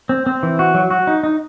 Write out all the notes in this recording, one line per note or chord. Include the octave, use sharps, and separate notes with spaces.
C4
C4
E3
F#4
F#3
F#4
D#4
D#4